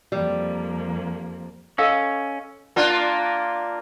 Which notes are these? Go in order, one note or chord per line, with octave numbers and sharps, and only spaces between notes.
F2 G3 A#3
C#4 A4 D#5 F5
A#3 D4 F4